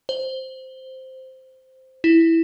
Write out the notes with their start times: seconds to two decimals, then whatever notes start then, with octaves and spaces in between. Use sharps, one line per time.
0.09 C5
2.04 E4